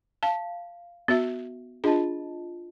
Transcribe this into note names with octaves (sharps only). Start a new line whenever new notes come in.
F5 A5
B3 F#4 E5
D4 F4 G#4 D#5 A5